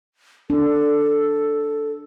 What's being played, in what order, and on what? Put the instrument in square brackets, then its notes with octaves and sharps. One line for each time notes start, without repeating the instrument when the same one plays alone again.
[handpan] D4 [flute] A4